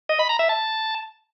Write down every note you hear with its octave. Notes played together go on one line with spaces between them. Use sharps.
D#5
B5
A#5
E5
A5